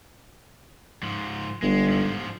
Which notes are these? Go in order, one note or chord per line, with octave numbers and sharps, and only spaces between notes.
G#2 F3
G1 G#3
G#2 F3